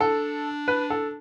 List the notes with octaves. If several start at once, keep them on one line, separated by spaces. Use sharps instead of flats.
D4 A4
B4
A4